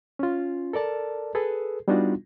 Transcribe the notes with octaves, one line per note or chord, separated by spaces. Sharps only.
C#4 F4
A4 A#4 D5 A5
G#4 A4 B4
G3 B3 D4 D#4 F4 F#4